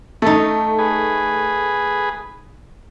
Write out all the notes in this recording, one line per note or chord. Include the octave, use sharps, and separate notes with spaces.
A3 D#4 A4
G#4 B4